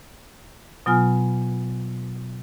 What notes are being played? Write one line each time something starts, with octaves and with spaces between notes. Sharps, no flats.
B2 F#3 B3 F4 G#5 F6